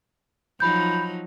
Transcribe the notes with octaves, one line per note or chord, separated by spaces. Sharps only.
F3 F#3 D#4 B5 G6